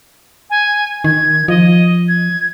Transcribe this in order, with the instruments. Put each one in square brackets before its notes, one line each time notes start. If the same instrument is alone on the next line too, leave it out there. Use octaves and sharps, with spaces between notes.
[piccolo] G#5
[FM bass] D#3 [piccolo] G#6
[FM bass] F3 [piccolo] D#5
[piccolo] G#6